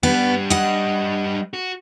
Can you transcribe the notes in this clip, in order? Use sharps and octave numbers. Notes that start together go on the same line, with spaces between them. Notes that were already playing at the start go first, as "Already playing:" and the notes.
G3 B3 D4
D#5 F#5
F#4